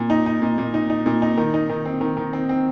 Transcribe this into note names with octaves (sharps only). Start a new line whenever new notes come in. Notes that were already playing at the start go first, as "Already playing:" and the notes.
Already playing: A#2
D#4
D#4
A#2
A#2
D#4
D#4
A#2
D#4
D#3
D#4
D#3
C4
D#3
D#3
C4
C4